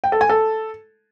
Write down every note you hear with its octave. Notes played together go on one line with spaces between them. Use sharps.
G5
A4
G#5
A4